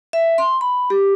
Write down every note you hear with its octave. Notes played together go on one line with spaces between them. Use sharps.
E5
C6
B5
G4